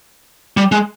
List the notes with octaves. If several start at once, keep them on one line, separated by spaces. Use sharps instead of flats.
G3
G#3